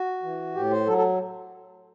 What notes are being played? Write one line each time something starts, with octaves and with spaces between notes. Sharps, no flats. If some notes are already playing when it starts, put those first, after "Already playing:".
Already playing: F#4
E3
A2 G4
C5
F#3 A4
A4